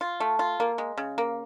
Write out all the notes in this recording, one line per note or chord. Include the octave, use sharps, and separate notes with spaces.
F4
A3
F4
A#3
G#3
C#3
A#3